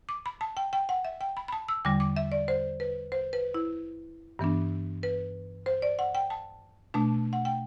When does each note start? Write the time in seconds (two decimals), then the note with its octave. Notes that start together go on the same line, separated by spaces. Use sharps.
0.09 D6
0.26 B5
0.41 A5
0.57 G5
0.73 G5
0.89 F#5
1.05 E5
1.21 G5
1.37 B5
1.48 B5
1.52 A5
1.68 E6
1.85 E2 D3 G3 D6
2.00 D6
2.16 E5
2.32 D5
2.48 C5
2.80 B4
3.12 C5
3.33 B4
3.54 E4
4.39 G2 E3 B3 D4
5.03 B4
5.66 C5
5.82 D5
5.99 F#5
6.15 G5
6.30 A5
6.94 B2 A3 D4 A5
7.33 F#5
7.45 G5